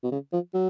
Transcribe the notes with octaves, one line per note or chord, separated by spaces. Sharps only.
B2
C#3
F3
F#3